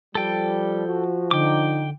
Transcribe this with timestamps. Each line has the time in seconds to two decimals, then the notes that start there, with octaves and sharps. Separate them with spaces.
0.15 F3 G3 A4 G5
0.87 F#4
1.31 D3 D#4 G5 D6